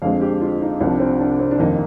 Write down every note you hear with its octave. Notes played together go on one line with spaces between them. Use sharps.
F2 D3 G#3 C4 F5
G4
F4
D#4
C2 C3 F3 D4
C4
D4
C4
D4
F2 D#3 A#3 D#4